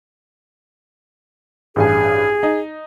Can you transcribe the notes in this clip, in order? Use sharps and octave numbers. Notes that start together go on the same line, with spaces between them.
A1 G2 G#4 G#5
D#4